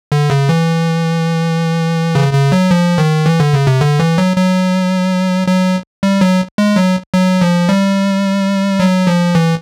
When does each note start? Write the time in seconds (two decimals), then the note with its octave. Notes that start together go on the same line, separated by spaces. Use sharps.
0.12 D3
0.30 C#3
0.49 E3
2.15 C#3
2.33 C#3
2.52 F#3
2.71 F3
2.98 D#3
3.26 E3
3.40 D3
3.53 C#3
3.67 C3
3.81 D3
4.00 E3
4.18 F#3
4.36 F#3
5.47 F#3
6.03 G3
6.21 F#3
6.58 G#3
6.76 F#3
7.13 F#3
7.41 F3
7.69 G3
8.80 F#3
9.07 F3
9.35 E3